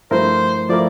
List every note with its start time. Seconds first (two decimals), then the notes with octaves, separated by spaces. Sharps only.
0.11 G2 F3 A3 E4 A#4 C5
0.69 F3 A3 E4 A#4 D5